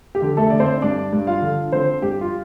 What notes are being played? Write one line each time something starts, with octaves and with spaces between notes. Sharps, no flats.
G4
D3
A3 A4
D3 D5
C4 C5
G2 D4 D5
G2
F4 F5
D3
D3 C4 C5
G2 G4
F4